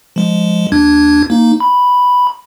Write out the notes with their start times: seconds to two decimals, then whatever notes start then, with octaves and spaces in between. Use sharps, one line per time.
0.16 F3 G#3
0.72 D#2 D4 G#6
1.30 A#3 D#4
1.60 B5